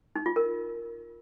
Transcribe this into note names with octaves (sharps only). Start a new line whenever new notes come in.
D#4
F4
A#4